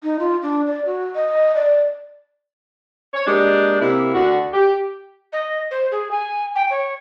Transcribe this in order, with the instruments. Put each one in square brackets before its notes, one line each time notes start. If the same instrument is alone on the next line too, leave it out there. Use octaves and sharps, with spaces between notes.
[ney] D#4
F4
D4
D5
F#4
D#5
D5
[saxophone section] C#5
G#3 A#3 D4 G4
C3 A#3 E4
D2 D3 F#4
G4
[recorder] D#5
C5
G#4
G#5
G5
C#5